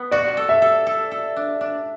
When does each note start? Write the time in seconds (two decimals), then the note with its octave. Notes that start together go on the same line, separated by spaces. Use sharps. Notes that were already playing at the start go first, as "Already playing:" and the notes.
Already playing: B3
0.11 F#4 D5
0.37 A4
0.49 E5
0.62 A4
0.87 A4
1.11 A4
1.36 D4
1.61 D4